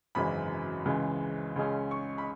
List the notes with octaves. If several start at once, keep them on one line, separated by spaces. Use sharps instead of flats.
G#1 F#2 C#3 E3 G#3 B5
C#2 C#3 E3 G#3
C#2 C#3 G#3 C#4
C#6
B5